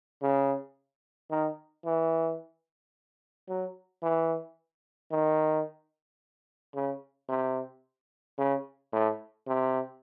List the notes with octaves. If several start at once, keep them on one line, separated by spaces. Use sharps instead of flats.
C#3
D#3
E3
F#3
E3
D#3
C#3
C3
C#3
A2
C3